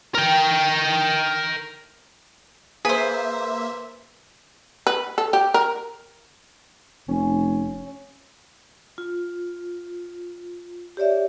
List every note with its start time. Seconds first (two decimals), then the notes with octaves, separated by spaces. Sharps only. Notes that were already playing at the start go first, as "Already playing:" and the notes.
0.15 A#4 G5
2.85 A#3 G#4 B4 C5 E5
4.87 B4
5.18 A4
5.33 G4
5.54 A#4
7.08 F1 C#4
8.98 F4
10.97 G4 C#5 D5 E5